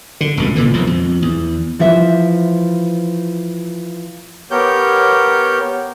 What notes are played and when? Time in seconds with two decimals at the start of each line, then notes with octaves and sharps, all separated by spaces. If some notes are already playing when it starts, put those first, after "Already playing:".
0.21 D3
0.37 F1 C#2 B2
0.55 C2 A#2 D3 E3
0.73 E1 B1 F2 F3
0.87 F2
1.22 E2
1.79 E3 F3 C5 E5
4.51 B3 G4 A#4 C#5 G6